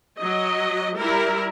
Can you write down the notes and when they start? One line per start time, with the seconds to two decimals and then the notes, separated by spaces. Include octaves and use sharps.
0.19 F#3 D#5
0.97 G3 E4 A#4